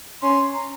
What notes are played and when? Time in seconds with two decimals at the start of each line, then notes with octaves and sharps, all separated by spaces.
0.22 C#4 C6
0.54 A#5